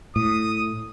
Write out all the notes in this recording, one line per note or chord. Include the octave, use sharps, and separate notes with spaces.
A2 D#6